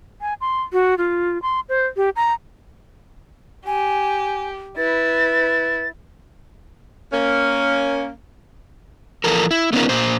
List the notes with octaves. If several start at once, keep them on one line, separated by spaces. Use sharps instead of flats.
G#5
C6
F#4
F4
C6
C5
G4
A#5
G4 G#5
E4 B4 A6
A#3 C#4
E3 F3 A4 A#4
E4
A3 B3 C#4 D#4 F4 A#4
A#2 C5